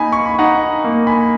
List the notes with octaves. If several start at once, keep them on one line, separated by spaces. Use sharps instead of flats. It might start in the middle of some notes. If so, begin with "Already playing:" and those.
Already playing: A#3 D#4 G#5 B5
C#6
B5
D#4 F#5 A#5
A#3
G#5 B5